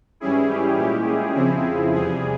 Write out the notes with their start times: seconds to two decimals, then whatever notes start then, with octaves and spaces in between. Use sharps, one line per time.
0.20 G#2 E3 G3 C#4 E4 G#4
0.49 G4
0.78 A#2 G#3 C#4 E4 G4
1.07 G#4
1.35 F2 C#3 F3 C4 E4
1.94 E2 C3 G3 G#4